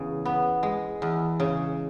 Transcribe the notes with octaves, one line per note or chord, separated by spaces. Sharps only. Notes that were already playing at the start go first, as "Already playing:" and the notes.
Already playing: E2 C#3
B3
G#3
E2
C#3